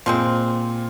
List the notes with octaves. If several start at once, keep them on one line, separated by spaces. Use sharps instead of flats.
A#2 F3 G#3 C4